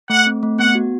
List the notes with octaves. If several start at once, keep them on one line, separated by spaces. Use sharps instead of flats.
A3 F#5
C4
A3
B3 F#5
F#4